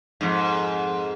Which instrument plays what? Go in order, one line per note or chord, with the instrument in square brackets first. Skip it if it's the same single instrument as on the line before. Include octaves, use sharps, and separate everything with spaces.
[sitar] F2 G#2